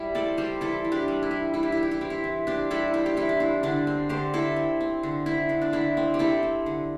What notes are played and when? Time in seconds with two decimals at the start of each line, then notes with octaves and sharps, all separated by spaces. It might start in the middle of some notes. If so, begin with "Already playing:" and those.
Already playing: G3 E4
0.15 C4 A4 D5
0.37 G3 G4 C5
0.61 E3 E4 A4
0.85 E3
0.92 D4 G4
1.08 G3
1.23 E4
1.31 G3
1.54 E3 E4
1.63 G4
1.72 E3 E4
1.83 G4
1.91 E4
2.01 C4 G4
2.10 E4
2.24 E3
2.47 C4 D4 G4
2.71 G3 E4 A4
2.94 C4 E4
3.06 G4
3.17 E3 E4
3.29 D4
3.40 C4 E4
3.63 D3 D4
3.87 C4
4.09 D3 G4 C5
4.34 C4 E4 A4
4.56 C4
4.81 C4
5.03 D3
5.26 C4 E4
5.49 D3
5.61 D4
5.73 D3 E4
5.97 C4
6.14 G4
6.19 C4 E4 A4
6.43 C4
6.66 D3